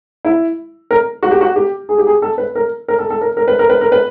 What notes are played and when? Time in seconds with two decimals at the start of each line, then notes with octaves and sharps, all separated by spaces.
0.25 E4
0.91 A#4
1.23 F#4
1.31 G4
1.41 F#4
1.56 G4
1.89 G#4
1.98 G4
2.07 G#4
2.22 A4
2.38 B4
2.55 A#4
2.88 A#4
2.99 A4
3.10 A4
3.21 A#4
3.37 A#4
3.48 B4
3.59 A#4
3.70 B4
3.81 A#4
3.92 B4